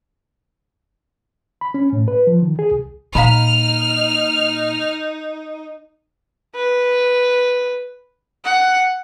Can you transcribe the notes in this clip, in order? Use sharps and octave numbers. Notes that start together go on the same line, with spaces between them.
B5
C#4
A2
B4
F3
D#3
G#4
C2
A#2 D#4 F5 A#5 B5 F6
B4
F#5